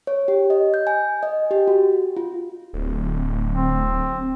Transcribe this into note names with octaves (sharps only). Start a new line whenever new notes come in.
C#5
G4
D#5
G6
G#5
D#5
G4
F#4
F4
D1
C4